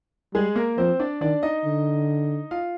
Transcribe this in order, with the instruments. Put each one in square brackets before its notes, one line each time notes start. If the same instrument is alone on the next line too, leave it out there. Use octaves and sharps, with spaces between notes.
[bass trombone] G3 [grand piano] G#3 G#4
[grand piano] A#3 A#4
[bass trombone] F3 [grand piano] C4 C5
[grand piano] D4 D5
[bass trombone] D#3 [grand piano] D4 D5
[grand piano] D#4 D#5
[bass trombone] D3
[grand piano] F4 F5